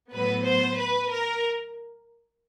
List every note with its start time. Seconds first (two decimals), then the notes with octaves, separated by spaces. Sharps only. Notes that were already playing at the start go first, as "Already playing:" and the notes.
0.11 A2 F#3 B3 B4
0.44 C5
0.77 B4
1.10 A#4